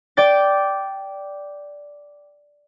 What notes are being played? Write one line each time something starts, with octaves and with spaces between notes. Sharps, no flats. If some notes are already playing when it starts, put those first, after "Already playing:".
D5 G5 A6